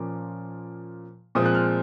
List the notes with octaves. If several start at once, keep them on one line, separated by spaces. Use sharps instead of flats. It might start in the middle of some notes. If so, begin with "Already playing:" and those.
Already playing: A#2 F3 A#3 C#4 D6
A#2 F3 G#3 C4 D#6
F#6
F6